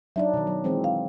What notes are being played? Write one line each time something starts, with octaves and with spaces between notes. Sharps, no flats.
F#3 D4 D#4 D5 E5
B2 D#3
F#3
E3 G#3 C4
F5